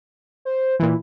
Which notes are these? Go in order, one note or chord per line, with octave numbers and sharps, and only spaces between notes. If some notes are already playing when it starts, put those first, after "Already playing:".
C5
A#2 E3 E4